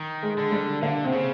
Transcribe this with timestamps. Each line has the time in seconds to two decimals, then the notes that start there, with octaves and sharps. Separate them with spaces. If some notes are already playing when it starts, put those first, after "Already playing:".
Already playing: D#3
0.23 G#3
0.38 D3
0.52 G3
0.82 D3 A#3
1.04 C3 C4
1.12 C#3